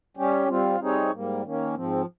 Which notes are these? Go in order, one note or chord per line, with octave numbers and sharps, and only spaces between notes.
G3 C#4 G4
G3 C4 F4
G3 C4 D#4 G#4 C#5
G#2 G3 A#3
D#3 A#3 C#4
G#2 F3 C4